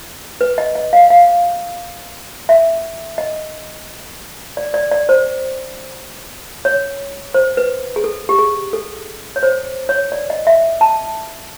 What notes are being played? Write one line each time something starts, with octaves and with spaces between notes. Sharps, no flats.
B4
D#5
D#5
F5
F5
E5
D#5
D5
D5
D5
C5
C#5
C5
B4
G#4
A4
G4
G#4
A4
C#5
C5
C#5
D5
D#5
E5
A5